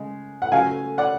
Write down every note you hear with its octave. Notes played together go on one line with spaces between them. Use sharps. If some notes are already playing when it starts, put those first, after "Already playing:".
Already playing: C#3 G#3
F#5
C#3 F#3 A3 F5 G#5
D5 F#5